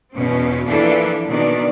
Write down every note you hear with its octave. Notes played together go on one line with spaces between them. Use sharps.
E2 B2 C4 C#4
E3 F3 A#3 D4 A4
B2 D#3 D4 D5